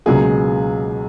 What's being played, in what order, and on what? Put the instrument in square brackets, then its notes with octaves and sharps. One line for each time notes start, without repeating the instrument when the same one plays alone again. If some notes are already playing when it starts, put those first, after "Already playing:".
[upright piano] C#2 B2 F#3 A#3 F4 [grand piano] G#4